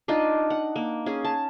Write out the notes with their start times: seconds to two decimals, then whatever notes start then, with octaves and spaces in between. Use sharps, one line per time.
0.08 D4 D#4 F4 D#5
0.50 F#5
0.76 A#3
1.06 C#4 G#4
1.25 A5